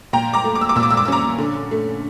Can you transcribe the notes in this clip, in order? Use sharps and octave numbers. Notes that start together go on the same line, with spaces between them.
A#2 G5 A#5
A#5 D6
A3
D6
E6
D6
A#2 E6
D6
E6
D6
E6
C#4 A#5 D6
D3
A3